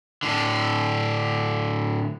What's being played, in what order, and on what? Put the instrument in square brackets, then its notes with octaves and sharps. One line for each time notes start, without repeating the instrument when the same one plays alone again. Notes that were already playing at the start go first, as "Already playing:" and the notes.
[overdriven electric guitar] A2 D3